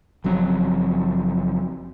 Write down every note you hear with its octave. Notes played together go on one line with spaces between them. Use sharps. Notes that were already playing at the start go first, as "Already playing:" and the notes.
F#1 F3 F#3 C4